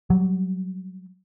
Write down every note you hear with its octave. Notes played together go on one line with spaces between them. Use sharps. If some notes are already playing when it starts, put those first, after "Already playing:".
F#3 G3